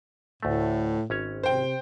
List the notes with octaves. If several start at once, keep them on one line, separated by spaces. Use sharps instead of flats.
D2 A2 A3
G#1 C#4 C#5
C3 C5 G5